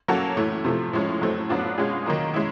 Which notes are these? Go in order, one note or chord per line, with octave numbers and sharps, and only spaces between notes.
F#3 A#3 C#4 F#4 A4
A2 E3 A3
C3 F3 A3
A2 F3 G#3 C#4
A2 F#3 A3 C4
F#3 B3 D4 F4
B2 G#3 C#4 F4 G#4
D#3 F#3 A#3 D#4
G#3 C#4 E4